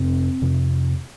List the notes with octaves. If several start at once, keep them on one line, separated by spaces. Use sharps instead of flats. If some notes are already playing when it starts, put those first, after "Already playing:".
Already playing: F2 C3 C4
F2 C3